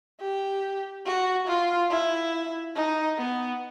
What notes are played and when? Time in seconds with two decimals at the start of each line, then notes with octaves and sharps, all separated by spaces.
0.20 G4
1.06 F#4
1.47 F4
1.90 E4
2.75 D#4
3.17 B3